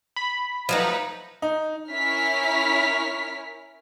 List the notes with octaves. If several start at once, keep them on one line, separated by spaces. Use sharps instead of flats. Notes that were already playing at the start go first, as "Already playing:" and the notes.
B5
F3 F#3 A3 D#4 B4 A#5
D#4
C#4 E4 A#4 C#5 F6 B6